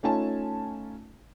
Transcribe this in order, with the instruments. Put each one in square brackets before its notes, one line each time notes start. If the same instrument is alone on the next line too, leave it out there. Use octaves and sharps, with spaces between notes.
[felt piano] A3 C#4 D#4 F4 G#5 A5